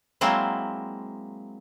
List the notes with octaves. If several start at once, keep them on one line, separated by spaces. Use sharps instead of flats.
F#3 G#3 A#3 C4 E4